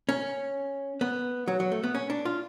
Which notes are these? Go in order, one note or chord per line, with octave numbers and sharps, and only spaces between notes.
C#4
B3
F#3
F#3
A3
B3
C#4
D4
F4